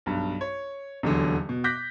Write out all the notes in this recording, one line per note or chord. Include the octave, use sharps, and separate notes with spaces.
B1 G2
C#5
D#1 E2 D3 F#3
B2
D6 F#6 G6 A#6 B6